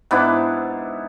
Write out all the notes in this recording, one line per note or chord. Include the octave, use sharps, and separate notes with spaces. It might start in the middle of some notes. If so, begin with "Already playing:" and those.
G#2 B3 D4 E4